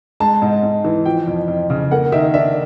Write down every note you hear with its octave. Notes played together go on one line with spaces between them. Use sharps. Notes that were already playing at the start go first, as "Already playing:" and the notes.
G#3 A5
G#2
G#2
E3
F3 G5
F2
F2
C#3
A#3 F#5
D#3 E5
D4 E5